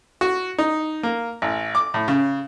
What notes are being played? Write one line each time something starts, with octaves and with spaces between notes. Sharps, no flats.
F#4
D#4
A#3
A1
D6
A2
C#3